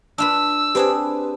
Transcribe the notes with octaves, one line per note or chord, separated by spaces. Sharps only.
D4 F4 B4 E6
C4 D4 G4 G#4 B4 C5